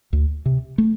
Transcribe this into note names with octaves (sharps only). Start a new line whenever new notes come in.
D2
C3
A3